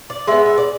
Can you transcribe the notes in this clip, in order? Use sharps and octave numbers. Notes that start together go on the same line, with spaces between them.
D5
G#3 B3 E5
E5
D5